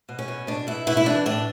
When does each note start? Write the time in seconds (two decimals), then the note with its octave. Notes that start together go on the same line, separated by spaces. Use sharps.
0.09 B2
0.19 C#4
0.28 B2
0.47 B2 D4
0.67 B2 E4
0.87 B2 E4
0.97 E4
1.06 E3 D4
1.26 A2 D4